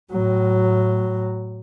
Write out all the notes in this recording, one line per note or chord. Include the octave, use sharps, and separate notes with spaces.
A2 F#3